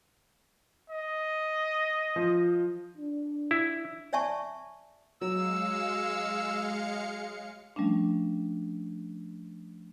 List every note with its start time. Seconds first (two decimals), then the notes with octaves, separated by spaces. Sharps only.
0.90 D#5
2.16 F3
2.97 D4
3.51 E4
4.13 C#5 D5 E5 G#5 A5 C#6
5.21 F#3 G#3 F5 E6 C#7
7.76 F3 G3 A3 C#4 D4